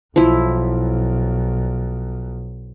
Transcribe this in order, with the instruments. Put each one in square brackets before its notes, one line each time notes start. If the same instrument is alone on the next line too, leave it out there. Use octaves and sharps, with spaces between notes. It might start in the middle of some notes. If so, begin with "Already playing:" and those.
[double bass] B1 [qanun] F3 E4